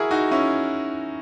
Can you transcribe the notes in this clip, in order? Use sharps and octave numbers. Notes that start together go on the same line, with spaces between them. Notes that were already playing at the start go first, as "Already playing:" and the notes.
Already playing: E4 F#4 G#4 A#4
D#4 F#4
C#4 E4